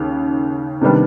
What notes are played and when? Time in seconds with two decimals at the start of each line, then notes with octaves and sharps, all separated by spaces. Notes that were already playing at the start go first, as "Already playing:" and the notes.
Already playing: D#2 C#3 D#4
0.81 C3 D#3 G3 B3 D4